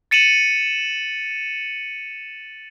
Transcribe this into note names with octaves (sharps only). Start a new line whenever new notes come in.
A6 C#7 D#7 E7 F#7